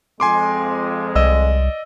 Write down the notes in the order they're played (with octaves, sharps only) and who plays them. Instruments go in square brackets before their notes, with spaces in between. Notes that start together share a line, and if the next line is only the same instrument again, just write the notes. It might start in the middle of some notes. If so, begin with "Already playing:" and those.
[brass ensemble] F2 G#3 [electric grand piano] G#5 C6 D6
[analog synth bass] C2 [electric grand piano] D5 D#5 E6